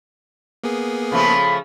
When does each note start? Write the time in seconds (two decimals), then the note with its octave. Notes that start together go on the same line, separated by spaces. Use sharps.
0.63 A#3 B3 G#4
1.12 C#3 F3 A3 B5